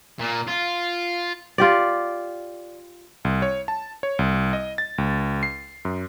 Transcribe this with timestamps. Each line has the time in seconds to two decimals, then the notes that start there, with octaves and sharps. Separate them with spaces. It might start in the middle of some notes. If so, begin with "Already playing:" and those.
0.20 A#2
0.48 F4
1.58 F4 G4 D5
3.25 C2
3.42 C#5
3.68 A5
4.03 C#5
4.19 C2
4.53 D#5
4.78 A6
4.98 C#2
5.43 C7
5.85 F#2